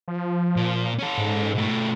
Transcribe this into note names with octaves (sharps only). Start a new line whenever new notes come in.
F3
A#2
C#4 A4
G#2
B2 A3